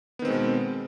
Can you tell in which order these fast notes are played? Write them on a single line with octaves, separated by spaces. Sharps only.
B3 D#3 C4 G#3 B2